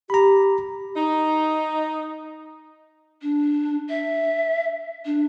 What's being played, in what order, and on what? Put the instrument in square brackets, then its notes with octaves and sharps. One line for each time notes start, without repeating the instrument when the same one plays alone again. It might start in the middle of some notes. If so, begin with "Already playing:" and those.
[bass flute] G4 [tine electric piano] A#5 B5
[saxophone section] D#4
[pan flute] D4
E5
D4